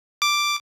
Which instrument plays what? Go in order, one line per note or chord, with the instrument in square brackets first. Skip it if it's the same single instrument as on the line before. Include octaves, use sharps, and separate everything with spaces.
[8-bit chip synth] D6